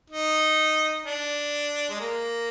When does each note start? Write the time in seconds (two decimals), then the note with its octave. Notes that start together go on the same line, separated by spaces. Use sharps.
0.10 D#4
1.05 D4
1.89 G#3
2.00 A#3